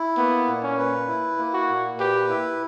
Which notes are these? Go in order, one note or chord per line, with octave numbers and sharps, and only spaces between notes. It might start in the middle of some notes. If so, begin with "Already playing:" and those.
Already playing: E4
A#3 B3
A#2
C#4
B4
E4
A#3
F#4
A#2
G4 B4
E4